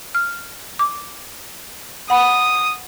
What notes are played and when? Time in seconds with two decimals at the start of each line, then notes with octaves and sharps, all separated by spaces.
0.15 F6
0.79 D6
2.10 F#5 B5 D#6